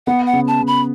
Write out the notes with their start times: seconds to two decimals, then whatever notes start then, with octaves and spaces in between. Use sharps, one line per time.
0.07 B3 F#5
0.26 F#5
0.33 C#3
0.48 A5
0.61 C#3
0.67 B5